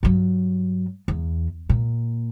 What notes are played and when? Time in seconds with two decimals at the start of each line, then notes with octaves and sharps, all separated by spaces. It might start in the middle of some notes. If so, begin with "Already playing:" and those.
0.03 G2 F#3
1.08 E2
1.69 A#2